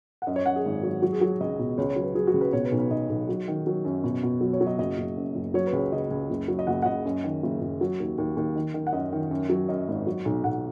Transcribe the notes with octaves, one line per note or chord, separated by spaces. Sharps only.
F#5
F#2 D#5
C#5
F#2 F#5
G#4
G#1
F#3
F#3 F#4
G#4
F#3 F#4
C#2 D#5
B2
C#2 C#5
C#5
F#3
B4
F#3 G#4
F#4
C#2
B4
B2 C#5
B4
B1
B4
B1 D#5
B1
F#3
D#3
F#3
F#2
B2
B2
F#3
C#5
F#3
D#5
F#1 D#5
F#1
F#2
F#1
F#3 C#5
B4
C#2
C#5
C#3 D#5
C#2
F#1
F#3
D#5
F#1 F#5
F#5
F#1 D#5
F#2
D#3
F#1
F#1
F#3
D#2
D#2
D#2
D#3
D#3
F#5
F#2 D#5
D#3
F#2
F#3
F#2 D#5
G#1
F#3
B1
B1 F#5